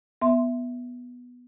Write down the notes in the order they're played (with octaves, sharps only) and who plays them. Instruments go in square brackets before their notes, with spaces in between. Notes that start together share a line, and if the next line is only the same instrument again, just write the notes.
[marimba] B3 E5 C6